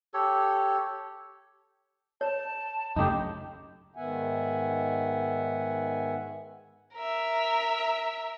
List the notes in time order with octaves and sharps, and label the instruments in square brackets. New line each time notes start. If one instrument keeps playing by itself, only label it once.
[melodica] G4 A4 C#5
[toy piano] C#5 [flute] A5
[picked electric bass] F#2 C#3 A3 [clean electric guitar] D#4 G4
[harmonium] G#2 D#3 B3 E5 F#5 G#5
[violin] A#4 E5